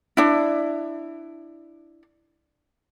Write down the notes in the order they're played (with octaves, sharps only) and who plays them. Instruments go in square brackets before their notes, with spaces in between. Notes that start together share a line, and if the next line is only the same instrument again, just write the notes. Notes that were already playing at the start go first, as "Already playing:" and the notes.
[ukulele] D4 E4